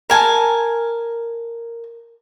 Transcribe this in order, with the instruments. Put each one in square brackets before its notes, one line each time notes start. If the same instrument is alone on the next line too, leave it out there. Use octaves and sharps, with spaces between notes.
[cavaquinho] A#4 G#5 A5